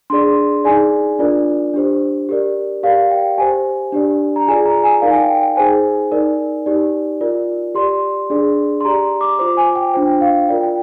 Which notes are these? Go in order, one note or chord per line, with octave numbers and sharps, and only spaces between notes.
D4 G#4 D5 C6
D#4 G#4 D5 G#5
D4 F4 A#4 D5
D4 G4 C5
G4 A#4 D5
G4 A#4 D5 F5
G5
G4 C5 G#5
D4 G4 D5
A#5
F4 G#4 D5 G#5
A#5
G#5
D#4 A#4 D5 F5
G#5
G5
G5
G5
D#4 G#4 C5 G#5
D#4 A#4 D5
D#4 G4 D5
F4 A#4 D5
G4 D5 C6
D4 G#4 D5
C6
G4 D5 A#5
D6
F4 C5 D6
G#5
G5
D4 F4 C5 G5
F5
F4 A#4 D5 G5
G5